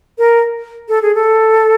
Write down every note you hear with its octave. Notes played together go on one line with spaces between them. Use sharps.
A#4
A4
G#4
A4